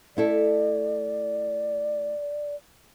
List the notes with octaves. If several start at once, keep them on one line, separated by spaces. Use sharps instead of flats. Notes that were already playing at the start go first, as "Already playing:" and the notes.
A3 E4 A4 D5